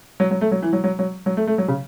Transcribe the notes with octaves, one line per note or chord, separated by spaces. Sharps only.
F#3
F#3
A3
F#3
E3
F#3
F#3
F#3
F#3
A3
A3
F#3
C#3